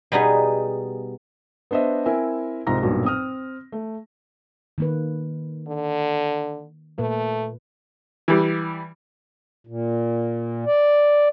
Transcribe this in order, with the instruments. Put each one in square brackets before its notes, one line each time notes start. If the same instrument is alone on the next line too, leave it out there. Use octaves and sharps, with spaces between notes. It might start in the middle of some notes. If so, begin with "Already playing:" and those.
[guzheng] B2 G3 B3 D#4 G#4
[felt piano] B3 D4 C5 D#5 E5
C4 E4 A#4 E5 G#5
C2 G#2 F4 A#5 A#6
B1 G2 A#2 F#3
C4 D#6 F6
A3
[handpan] D#3 A#3 B4
[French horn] D3
[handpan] A#2 A#3 B4 [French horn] A3
[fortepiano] E3 G3
[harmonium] A#2
D5